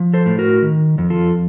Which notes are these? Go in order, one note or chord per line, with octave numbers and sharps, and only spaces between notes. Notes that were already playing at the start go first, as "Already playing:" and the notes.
Already playing: F3
A4 C5
A2
F#4 A#4
D#3
F2
F4 A4